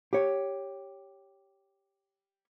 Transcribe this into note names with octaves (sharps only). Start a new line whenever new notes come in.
G4 C#5